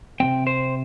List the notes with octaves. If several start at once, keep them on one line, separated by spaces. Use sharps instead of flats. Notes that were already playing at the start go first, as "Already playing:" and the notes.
C3 F3 C4 G5
C5